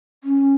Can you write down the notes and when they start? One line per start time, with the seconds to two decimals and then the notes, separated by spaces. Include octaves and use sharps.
0.24 C#4